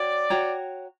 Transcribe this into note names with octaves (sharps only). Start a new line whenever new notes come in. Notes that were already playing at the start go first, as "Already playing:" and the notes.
Already playing: F#4 C#5 D5 G5
F#4 C#5 G5 A#5